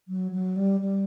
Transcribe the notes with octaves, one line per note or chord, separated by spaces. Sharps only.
F#3
F#3
G3
G3